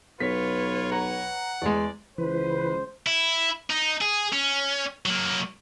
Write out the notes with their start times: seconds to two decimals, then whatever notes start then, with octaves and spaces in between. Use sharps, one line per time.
0.20 B1 F4 B4 C#5 B6
0.92 F#5 A#5
1.62 E2 G#3 D5
2.18 C#2 E3 B4 C5
3.07 E4
3.70 D#4
4.01 G#4
4.32 C#4
5.06 F#3 A#3